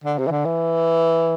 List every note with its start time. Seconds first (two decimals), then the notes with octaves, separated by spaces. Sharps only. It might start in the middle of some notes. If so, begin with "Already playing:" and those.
0.04 D3
0.18 C3
0.27 E3
0.31 D3
0.45 E3